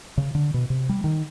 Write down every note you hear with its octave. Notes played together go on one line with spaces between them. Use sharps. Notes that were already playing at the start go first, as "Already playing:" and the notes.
C#3
D3
B2
C3
G3
D#3